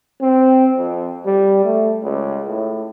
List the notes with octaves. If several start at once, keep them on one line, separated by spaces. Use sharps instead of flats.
C4
F2
G3
A3
C#2
A2